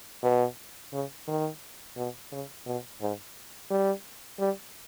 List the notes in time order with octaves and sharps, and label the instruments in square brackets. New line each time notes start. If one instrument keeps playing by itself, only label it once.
[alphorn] B2
C#3
D#3
B2
C#3
B2
G#2
G3
G3